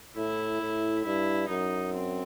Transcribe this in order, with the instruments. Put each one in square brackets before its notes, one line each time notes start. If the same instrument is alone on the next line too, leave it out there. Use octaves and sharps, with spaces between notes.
[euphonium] A2 [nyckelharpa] E4
[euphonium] A2
[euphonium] G2 [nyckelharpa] E4
[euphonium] F#2 [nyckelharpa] D#4
[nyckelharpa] C4